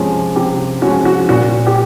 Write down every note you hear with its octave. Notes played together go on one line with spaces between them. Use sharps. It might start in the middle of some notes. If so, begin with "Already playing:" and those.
Already playing: C3 F3 G#3 C#4
C3 G4
F3 G#3 C#4 F#4
F#4
A#2 F#4
G4